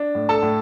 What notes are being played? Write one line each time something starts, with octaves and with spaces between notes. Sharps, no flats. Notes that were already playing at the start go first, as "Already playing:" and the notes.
Already playing: D4
A2
A4 A5
A2